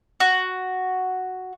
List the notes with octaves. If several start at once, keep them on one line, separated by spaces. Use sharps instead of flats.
F#4